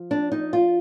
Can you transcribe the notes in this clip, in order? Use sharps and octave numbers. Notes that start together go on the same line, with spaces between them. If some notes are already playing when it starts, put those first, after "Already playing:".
Already playing: F3
D4
D#4
F4